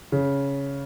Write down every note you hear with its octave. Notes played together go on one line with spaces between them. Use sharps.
C#3